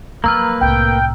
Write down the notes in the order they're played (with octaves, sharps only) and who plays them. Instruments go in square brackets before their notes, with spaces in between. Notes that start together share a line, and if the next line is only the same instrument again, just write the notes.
[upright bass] F3 F#3 [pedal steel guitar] A#3 B4 [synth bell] A#5 E6 F6
[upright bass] C2 A2 [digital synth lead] G5